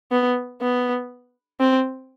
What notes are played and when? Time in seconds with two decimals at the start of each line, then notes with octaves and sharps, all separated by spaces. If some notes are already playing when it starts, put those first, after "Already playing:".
0.11 B3
0.61 B3
1.60 C4